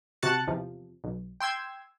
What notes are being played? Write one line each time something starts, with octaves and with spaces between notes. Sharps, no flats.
C3 F#4 A5 F#6 A6 C#7
E2 C3 F3
B1
G5 C6 E6 G#6